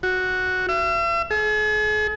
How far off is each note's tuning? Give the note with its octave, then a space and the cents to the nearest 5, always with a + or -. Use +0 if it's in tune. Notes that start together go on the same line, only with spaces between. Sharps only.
F#4 +0
E5 +40
G#4 +45